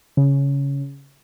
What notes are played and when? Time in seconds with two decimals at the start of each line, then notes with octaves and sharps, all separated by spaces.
0.17 C#3